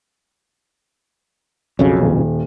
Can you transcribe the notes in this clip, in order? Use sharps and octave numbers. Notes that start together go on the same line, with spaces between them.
B1 F2 C#3 C#4 F#4 A4
D#1